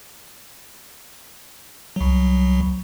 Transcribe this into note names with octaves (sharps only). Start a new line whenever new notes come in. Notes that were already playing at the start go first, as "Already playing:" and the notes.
C2 F#3